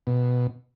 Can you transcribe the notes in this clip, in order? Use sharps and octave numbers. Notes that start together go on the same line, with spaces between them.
B2